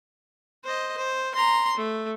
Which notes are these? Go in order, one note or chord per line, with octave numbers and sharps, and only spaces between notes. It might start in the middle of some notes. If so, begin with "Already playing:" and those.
C5 D#5
C5
A#5 C6
A3